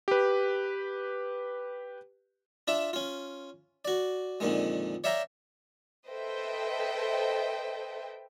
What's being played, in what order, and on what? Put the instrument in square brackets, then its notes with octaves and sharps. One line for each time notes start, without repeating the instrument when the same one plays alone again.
[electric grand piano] G4 B4
[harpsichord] D4 F4 E5
C#4 F4
F#4 D5
F2 A#2 D3 D#3 G#3
C#5 D5 E5 F5 G5 A#5
[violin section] A4 B4 C5 D#5 E5 G5